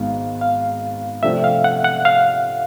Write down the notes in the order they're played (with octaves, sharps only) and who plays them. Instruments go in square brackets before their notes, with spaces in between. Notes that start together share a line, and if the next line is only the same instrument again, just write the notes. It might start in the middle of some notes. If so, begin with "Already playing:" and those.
Already playing: [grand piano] G#1 G#2 D#3 G#3 B3 [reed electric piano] F5
[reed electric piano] F5
[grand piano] C3 F3 A3 D4 G4 [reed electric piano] E5
[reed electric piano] F5
F#5
F#5
F5